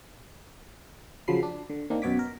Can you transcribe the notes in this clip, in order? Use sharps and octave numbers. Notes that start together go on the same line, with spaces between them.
C#3 F3 F#3 B5 C7
D4
D3
D#3 A#3 C4 D4
F#2 B2 B3 C#5 D6 B6
A#4